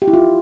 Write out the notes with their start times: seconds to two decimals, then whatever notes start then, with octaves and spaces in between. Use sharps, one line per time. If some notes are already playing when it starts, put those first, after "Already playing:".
0.02 G4
0.08 E4
0.13 F4